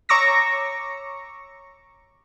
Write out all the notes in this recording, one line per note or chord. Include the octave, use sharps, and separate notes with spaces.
C#5 A#5 C#6 D6 E6 A#6